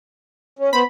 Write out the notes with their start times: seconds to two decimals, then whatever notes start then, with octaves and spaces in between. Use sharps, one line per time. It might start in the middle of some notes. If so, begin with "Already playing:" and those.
0.59 C#4
0.73 B3 C5 B5